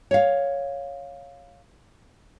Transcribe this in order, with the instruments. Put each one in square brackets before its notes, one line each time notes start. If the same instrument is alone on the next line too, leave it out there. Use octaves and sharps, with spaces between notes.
[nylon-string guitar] C#5 F5